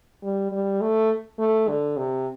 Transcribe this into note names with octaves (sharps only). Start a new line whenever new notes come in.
G3
G3
A3
A3
D3
C3